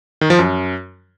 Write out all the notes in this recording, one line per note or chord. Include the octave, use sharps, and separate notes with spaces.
D#3
F3
F#2